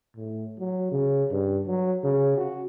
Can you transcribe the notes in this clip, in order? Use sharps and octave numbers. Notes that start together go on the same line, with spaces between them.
A2
F#3
C#3
G2
F#3
C#3
F#4